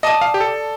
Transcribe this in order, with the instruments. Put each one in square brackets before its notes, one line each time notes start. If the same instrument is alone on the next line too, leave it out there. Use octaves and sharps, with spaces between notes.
[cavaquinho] D5 A5 D#6 [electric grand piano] D#5
[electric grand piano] F5
G4
A4